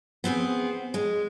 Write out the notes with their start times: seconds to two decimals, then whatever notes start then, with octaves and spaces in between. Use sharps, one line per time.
0.24 B3 C4 G4 G#4
0.94 G#3